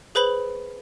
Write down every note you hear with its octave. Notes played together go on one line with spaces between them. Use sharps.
G#4 B4 C5 B5 F#7